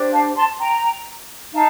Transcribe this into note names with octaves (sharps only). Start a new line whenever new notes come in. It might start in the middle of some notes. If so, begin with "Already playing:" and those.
Already playing: D4 G4 C5
F5 A5
A5 C6
G5 A#5
D#4 F5 A5